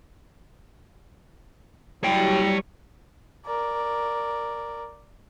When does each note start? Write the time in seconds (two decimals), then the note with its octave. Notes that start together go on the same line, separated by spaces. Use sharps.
2.04 F#3 G3 C#5 G5
3.45 A#4 D5